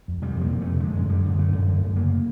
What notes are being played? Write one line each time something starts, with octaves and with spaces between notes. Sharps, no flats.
F2
C3 G3
F2 A#3
C3
F2 A3
D3 G#3
F#2
D3 G3
F#2
D3 A3
F#2
D3
F#2
C#3 A#3